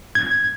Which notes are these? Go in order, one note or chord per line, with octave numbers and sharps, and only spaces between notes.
G#6